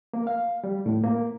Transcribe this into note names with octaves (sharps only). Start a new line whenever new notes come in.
A#3
F5
G3
A2
A#3